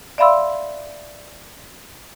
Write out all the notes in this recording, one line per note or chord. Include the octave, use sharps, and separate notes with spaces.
D5 E5 F5 B5 C6 E6